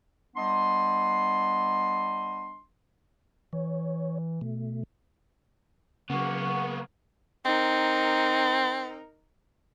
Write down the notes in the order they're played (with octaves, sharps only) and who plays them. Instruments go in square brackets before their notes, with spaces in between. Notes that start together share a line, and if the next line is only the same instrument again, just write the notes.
[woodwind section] G3 B3 D4 D#5 C6
[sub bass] E3 [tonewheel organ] C#5
[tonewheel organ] B2 A3
[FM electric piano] C#3 F#3 [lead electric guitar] A#3 B3 [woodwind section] G#4 F#5 C#6
[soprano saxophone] C4 [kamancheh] D#4 A#4